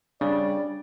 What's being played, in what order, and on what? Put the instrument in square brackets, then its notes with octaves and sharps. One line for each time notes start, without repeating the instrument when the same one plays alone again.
[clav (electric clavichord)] C#3 [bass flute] G3 [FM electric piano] D4 [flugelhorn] D5